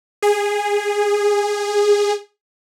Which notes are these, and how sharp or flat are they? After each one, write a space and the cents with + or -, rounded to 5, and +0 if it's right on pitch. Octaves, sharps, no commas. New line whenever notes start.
G#4 -15